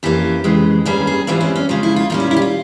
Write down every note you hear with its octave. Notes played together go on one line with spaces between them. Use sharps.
F2 E3 A#3 C#4 G4
F2 C#3 E3 G#3
G2 G3 A#3 C#4 G#4
G#4
G#2 E3 G3 C4 F4
C#4
C#4
C#3 F3 G#3 C#4
E4
F4
A#2 G3 C#4 F4
E4
E4
G4
F4